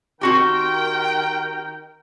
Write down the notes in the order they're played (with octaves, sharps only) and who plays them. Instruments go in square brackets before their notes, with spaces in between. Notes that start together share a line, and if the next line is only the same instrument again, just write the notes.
[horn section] D#3 A#4 G5 [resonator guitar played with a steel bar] C4 F#4 G4